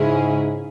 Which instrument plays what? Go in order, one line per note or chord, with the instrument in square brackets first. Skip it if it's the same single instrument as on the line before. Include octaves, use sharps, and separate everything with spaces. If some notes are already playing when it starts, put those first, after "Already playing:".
Already playing: [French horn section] G#2 [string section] C#3 G#3 C#4 E4 G#4